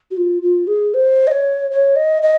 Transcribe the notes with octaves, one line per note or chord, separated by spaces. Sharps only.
F#4
F4
F4
G#4
C5
D#5
C#5
C#5
D#5
D#5